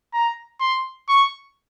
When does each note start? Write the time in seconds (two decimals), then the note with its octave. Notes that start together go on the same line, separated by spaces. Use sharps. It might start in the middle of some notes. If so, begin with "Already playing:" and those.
0.14 A#5
0.60 C6
1.09 C#6